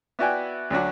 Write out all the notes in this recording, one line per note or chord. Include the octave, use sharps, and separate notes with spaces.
B3 E4 F#4 D5 G5 G#5
D2 F#3 D4 F#4